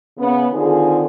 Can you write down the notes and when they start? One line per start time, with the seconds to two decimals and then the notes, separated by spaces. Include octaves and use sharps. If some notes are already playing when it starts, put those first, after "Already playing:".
0.17 C#3 B3
0.51 D3 D#3 C4 F4 G#4